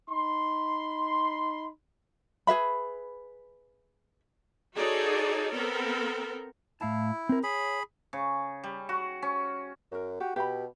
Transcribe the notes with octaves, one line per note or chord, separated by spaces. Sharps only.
D#4 B5 C6
G#4 B4 E5 B5
D#4 F#4 G#4 A4 C#5 D5
B3 C4 A4 A#4
A2 E4 F5 A5
C4 A#4
G#4 C#5 B5
C#3
G3
F#4
C#4
F#2 F#4 A#4
F#4 G4
B2 G4 F5 B5